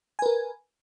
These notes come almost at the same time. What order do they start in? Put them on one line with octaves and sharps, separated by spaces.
G#5 B4 A#4